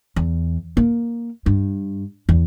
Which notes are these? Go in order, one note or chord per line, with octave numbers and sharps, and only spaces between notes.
E2
A#3
G2
E2